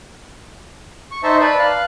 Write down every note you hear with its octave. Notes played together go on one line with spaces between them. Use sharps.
C#6
D#4 C5 D#5 E5 A5 C#6
B4 D5 A5 B5
F5 F#6